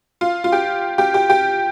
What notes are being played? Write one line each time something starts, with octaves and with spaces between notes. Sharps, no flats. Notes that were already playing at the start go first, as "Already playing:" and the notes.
F4
F4
G4
G4
G4
G4